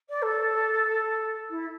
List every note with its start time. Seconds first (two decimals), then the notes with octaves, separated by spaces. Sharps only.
0.09 D5
0.22 A4
1.50 E4